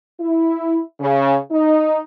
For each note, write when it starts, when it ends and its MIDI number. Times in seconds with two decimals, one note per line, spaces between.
0.20 0.81 64
1.00 1.36 49
1.51 2.00 63